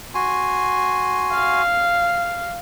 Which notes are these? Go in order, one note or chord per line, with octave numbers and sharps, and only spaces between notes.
F#4 G#5 C6
F5